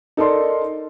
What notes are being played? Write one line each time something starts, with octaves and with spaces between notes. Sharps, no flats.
D#4 A4 A#4 D5 C6